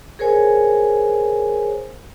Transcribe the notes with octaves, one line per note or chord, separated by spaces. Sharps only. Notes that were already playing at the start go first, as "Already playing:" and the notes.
G#4 A#4 C5 C#5 G#5